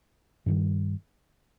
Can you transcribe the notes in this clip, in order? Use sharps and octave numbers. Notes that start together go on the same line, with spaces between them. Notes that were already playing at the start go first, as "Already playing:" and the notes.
G2 D#3 G3